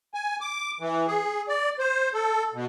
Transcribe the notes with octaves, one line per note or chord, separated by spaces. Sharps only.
G#5
D6
E3
G#4
D5
C5
A4
B2